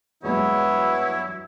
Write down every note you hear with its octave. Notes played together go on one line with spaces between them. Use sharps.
G2 E3 F#3 G#3 B3 E4 C#5